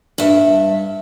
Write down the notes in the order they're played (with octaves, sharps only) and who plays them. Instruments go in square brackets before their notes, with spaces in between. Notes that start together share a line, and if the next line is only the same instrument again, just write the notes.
[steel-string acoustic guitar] G2 E5